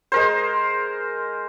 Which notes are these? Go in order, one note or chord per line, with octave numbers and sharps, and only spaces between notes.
G#3 A#4 C5